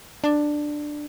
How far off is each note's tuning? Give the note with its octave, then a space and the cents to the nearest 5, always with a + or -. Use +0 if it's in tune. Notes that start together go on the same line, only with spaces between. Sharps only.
D4 +10